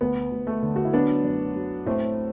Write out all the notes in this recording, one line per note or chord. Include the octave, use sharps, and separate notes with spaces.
D2 B3
D2
A3
D3
F#4
E4
F#3 B3 D4
F#2
F#3
A2 A3 C4